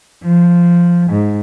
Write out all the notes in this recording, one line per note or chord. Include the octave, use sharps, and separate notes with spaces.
F3
G#2